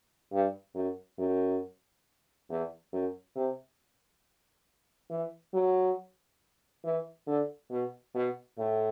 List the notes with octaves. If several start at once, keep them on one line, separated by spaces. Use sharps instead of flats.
G2
F#2
F#2
E2
F#2
C3
E3
F#3
E3
D3
B2
B2
A2